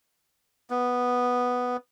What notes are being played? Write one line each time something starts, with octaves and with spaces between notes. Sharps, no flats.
B3